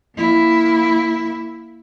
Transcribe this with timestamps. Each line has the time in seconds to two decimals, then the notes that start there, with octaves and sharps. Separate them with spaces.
0.16 A#3 E4